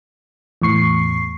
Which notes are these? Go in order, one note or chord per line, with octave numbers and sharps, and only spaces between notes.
E2 A2 C#6 C7